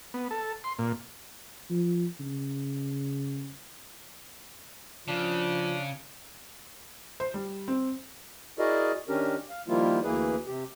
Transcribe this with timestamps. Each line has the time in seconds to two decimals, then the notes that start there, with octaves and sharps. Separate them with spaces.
0.14 B3
0.31 A4
0.64 C6
0.79 A#2
1.70 F3
2.20 C#3
5.08 C#3 F3 D4
7.20 C5
7.34 G3
7.68 C4
8.59 E4 F#4 G#4 A#4 D5 D#5
9.09 D#3 C#4 D4 G4 A#4
9.49 F5
9.68 D#3 F3 G3 A#3 E4 F4
10.04 D2 E3 A#3 E4 G#4 B4
10.47 C3 G4